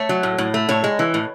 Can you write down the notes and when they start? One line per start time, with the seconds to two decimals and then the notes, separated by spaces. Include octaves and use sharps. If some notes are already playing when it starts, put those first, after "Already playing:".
Already playing: A3 C#5
0.09 F#3
0.23 A2
0.38 A2
0.54 A3
0.69 A2 C#5
0.84 G#3
0.99 E3
1.14 A2